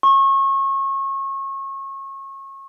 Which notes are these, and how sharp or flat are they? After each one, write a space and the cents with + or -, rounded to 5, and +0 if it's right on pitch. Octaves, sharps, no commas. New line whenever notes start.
C#6 -30